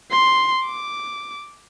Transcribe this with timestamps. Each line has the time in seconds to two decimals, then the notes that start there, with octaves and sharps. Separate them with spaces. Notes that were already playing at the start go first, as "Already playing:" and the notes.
0.11 C6
0.65 D6